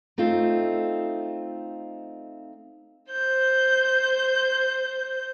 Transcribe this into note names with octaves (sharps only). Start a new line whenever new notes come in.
A3 C4 D#4 F4
C5 G6